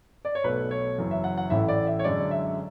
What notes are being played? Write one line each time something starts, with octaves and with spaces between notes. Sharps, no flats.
D5
C#5
B1 B2 A3 B4
C#5
F#1 F#2 E3
E5
F#5
F#5
A1 A2 E3 A3 E5
D5
E5
C#5
F#2 D3 G#3 D5
E5